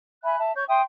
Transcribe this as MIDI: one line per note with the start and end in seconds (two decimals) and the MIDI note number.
0.23 0.38 76
0.23 0.38 80
0.23 0.38 83
0.23 0.38 90
0.38 0.51 76
0.38 0.51 81
0.55 0.64 73
0.55 0.64 85
0.55 0.64 91
0.68 0.81 76
0.68 0.81 79
0.68 0.81 84
0.68 0.81 87